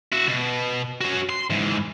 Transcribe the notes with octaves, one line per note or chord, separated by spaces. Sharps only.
E4 F#4
B2
C#4 F#4
C6
G#2 E3